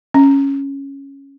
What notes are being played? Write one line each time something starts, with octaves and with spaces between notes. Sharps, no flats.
C#4